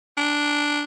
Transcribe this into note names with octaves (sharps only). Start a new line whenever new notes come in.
D4